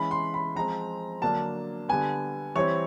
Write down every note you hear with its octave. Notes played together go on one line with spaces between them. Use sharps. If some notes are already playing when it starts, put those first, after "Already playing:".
Already playing: E3 G#3 C#4 B5
C6
B5
F3 G#3 C4 A#5
D3 F#3 A#3 D4 A5
D3 G3 B3 G#5
E3 G3 C4 C#5